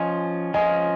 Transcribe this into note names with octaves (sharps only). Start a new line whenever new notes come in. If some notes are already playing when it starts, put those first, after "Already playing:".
Already playing: F3 C#4 F4 D#5 G#5
F3 C#4 F4 D#5 G#5